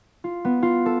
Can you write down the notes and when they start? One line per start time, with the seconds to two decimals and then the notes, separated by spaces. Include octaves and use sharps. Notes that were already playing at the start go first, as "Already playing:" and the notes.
0.24 F4
0.45 B3
0.63 F4
0.86 A4